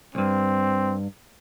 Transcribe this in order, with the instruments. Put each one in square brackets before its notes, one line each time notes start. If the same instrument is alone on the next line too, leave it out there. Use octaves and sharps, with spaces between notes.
[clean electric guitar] C2 G2 [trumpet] C4